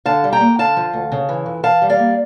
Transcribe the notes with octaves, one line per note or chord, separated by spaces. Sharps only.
D3 F5 A5
G3
G5 A#5
A#3
D3 F5 A5
F3
D2
C#3
E3
F2
E3 F5 A5
G3
D5 F5
A#3